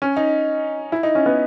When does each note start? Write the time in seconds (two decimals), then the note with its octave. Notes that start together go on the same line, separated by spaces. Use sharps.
0.02 C#4
0.17 D#4
0.92 E4
1.03 D#4
1.15 C#4
1.26 B3